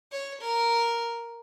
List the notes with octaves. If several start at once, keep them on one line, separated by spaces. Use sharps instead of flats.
C#5
A#4